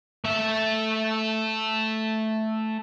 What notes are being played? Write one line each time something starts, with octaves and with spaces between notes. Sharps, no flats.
A3 E5